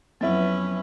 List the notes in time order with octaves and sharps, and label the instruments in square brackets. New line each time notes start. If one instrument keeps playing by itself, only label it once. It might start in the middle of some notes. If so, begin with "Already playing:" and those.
[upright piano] F2 B3 E4 [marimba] F#3 [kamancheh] C#4 B4